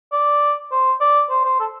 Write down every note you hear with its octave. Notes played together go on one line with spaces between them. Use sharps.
D5
C5
D5
C5
C5
A4